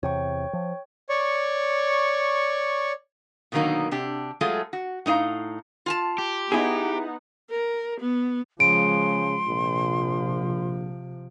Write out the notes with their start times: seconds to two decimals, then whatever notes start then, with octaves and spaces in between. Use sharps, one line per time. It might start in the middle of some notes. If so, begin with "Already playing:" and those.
0.03 E2 C3 C#5 G5 C#6
0.53 F3
1.09 C#5 D5 C#6
3.52 B2 D3 D#3 F#3 A#3 D#4
3.91 C3 D4 G4
4.41 F#3 G#3 A3 F4 G#4 A4
4.73 F#4
5.06 A2 D#4 D#5 F5 A#5
5.86 F4 G#5 A5
6.18 G4
6.52 B3 D#4 E4 G#4 F#5
7.50 A#4
8.01 B3
8.60 C#3 F3 G#3 C6 D7
9.48 A#1 C3 F3